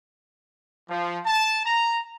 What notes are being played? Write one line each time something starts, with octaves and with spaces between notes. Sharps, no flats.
F3
A5
A#5